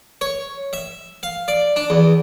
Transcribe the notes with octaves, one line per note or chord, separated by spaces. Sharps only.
C#5
E5
F5
D5
D4
E2